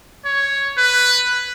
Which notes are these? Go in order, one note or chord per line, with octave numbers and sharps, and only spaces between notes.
C#5
B4